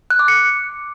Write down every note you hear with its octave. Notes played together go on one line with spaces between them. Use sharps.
F#6
D6
C#7